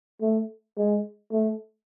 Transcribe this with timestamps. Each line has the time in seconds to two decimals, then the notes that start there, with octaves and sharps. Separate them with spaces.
0.22 A3
0.77 G#3
1.32 A3